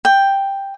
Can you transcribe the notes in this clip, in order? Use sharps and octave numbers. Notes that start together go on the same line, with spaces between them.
G5